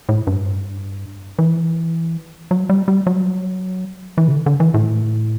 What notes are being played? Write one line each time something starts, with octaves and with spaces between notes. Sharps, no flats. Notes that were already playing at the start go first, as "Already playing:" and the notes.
A2
G2
E3
F#3
G3
G3
F#3
E3
C3
D3
D3
E3
A2